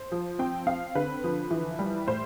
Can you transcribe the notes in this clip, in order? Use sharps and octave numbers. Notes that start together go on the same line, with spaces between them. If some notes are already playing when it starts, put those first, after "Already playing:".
Already playing: C5
F3
C4 G5
C4 F5
D3 B4
F3
E3
G3
A2 C5